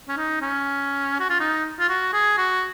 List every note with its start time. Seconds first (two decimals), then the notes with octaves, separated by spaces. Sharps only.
0.08 C#4
0.17 D#4
0.41 C#4
1.20 F#4
1.30 F4
1.40 D#4
1.79 F4
1.89 F#4
2.13 G#4
2.37 F#4